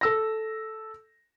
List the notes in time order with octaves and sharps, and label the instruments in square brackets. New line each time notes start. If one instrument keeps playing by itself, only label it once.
[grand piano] A4 E6 A#6